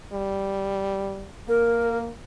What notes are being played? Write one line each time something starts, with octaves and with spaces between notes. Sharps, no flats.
G3
A#3 A#4